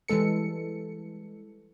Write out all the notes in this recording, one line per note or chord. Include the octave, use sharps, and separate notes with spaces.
E3 G3 G#3 A4 C#7